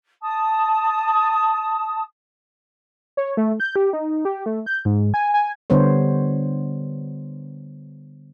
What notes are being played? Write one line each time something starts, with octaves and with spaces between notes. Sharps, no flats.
A5 D#6
C#5
A3
G6
G4
D#4
G4
A3
G6
G#2
G#5
G#5
D3 G3 B3 C5 C#5